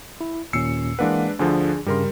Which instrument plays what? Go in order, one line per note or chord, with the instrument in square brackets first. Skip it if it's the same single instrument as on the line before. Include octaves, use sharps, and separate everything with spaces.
[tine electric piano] E4
[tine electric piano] D#2 A#2 C#4 [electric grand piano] E6 C7 C#7
[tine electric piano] E3 A#3 F#5 [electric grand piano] G#3 D4 B4
[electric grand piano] D2 D3 F3 [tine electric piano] D4 G#4
[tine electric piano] G2 C#3 [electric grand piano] G3 A#4 C6